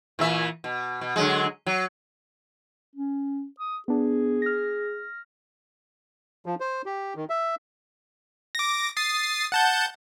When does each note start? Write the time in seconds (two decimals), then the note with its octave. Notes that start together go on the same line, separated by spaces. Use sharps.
0.19 A#2 E3 E5
0.64 B2
1.01 B2
1.16 D3 F#3 G#3
1.66 F#3
2.95 C#4
3.60 D#6
3.88 B3 D4 G#4
4.42 F6 A#6
6.46 F3
6.60 C5
6.86 G4
7.16 D#3
7.30 E5
8.55 D6 A#6
8.97 D#6 A6 C7
9.52 F#5 A5 G6